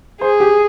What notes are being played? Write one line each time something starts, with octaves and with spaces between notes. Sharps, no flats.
G#4 C5
G4